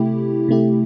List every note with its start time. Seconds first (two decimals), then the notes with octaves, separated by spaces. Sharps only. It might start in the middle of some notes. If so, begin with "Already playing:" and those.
Already playing: C3 A3 E4 G4
0.48 C3 A3 E4 G4